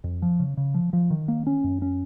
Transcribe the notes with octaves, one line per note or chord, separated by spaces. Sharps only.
F2
F3
C#3
C#3
F3
F3
D#3
A#3
C#4
F#2
C#4